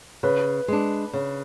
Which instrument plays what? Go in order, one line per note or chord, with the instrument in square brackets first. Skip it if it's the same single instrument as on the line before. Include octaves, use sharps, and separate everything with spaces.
[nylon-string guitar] C#3 [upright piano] B4
[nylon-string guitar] G#3 D4
C#3